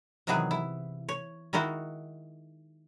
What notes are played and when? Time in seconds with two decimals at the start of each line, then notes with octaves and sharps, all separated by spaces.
0.27 C3 D#3 E3 F#3 B3 G#4
0.51 E4
1.09 C#5
1.53 D#3 G#3 D#4 E4 F#4